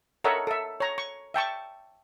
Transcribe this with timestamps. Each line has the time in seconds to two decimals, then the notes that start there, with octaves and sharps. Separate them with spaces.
0.24 A4 A#4 C#5 D#5 E5 F#5
0.47 A4 E5
0.80 C#5 A#5
0.98 C#6
1.34 E5 G5 A5 C#6